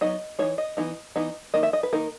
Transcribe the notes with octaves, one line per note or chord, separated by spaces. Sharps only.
F#3 B3 D#4 D#5
E3 A#3 D#4 C#5
D#5
E3 B3 D#4
E3 B3 D#4
D#3 A#3 D#5
E5
D#5
B4
D#3 A#3 D#4 A#4